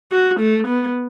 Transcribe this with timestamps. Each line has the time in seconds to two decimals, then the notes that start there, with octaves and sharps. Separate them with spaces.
0.12 F#4
0.40 A3
0.68 B3